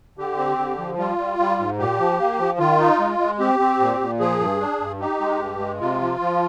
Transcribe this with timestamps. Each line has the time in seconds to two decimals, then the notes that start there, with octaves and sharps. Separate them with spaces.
0.17 D3 G4
0.38 C4
0.58 D3
0.78 F3
0.98 G3 F4
1.18 G3
1.39 G3
1.59 G#2
1.79 A#2 G4
1.99 F3
2.19 A#3
2.39 F3
2.59 D#3 F4
2.79 D#4
2.99 G#3
3.19 G#3
3.39 C4 G4
3.59 C4
3.80 A#2
4.00 A#2
4.20 F3 G#4
4.40 G2
4.60 D4
4.80 G2
5.00 D#4 G4
5.21 G#3
5.40 G2
5.60 G#3
5.80 C3 F4
6.01 F3
6.21 F3